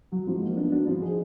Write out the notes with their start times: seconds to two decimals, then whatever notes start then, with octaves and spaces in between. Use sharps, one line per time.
0.12 F#3 F#4
0.27 F3 G#3
0.42 A#3 D#4
0.57 B3 D4
0.72 D4 F#4
0.87 F3 F4
1.02 D#4 G#4